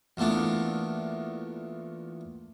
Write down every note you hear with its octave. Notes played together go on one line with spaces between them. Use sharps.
E2 A#2 A3 B3 D4